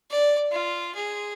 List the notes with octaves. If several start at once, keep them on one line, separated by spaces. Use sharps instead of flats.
D5
F4
G#4